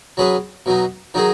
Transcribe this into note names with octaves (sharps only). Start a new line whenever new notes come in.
F#3 C#4 G#4 B4
B2 F#3 D#4
D#3 F#3 D#4 G#4